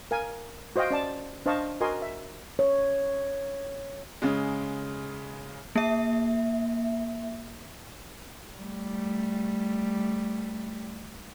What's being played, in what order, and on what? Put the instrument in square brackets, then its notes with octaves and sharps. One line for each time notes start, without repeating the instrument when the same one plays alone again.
[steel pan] A#4 F5 G#5
F#4 C5 D#5 F5 G5
C#4 D5 A5
D4 C5 D#5 F5 A5 C#6
F#4 A#4 D#5 G#5 C6
E5
[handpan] C#5
[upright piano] C#3 G#3
[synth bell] A#3 E5
[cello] G3 A3